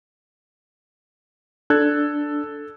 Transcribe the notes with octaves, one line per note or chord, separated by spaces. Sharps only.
D4 A4 F#6 G#6